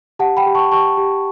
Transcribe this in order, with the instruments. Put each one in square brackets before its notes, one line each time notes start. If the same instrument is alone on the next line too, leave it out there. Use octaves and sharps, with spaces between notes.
[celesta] G4 F#5 A5
G5 B5
G4
A5 C#6
G4 A5 C#6
G4